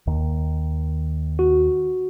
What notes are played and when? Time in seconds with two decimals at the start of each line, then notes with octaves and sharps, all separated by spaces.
0.07 D#2 D#3
1.39 F#4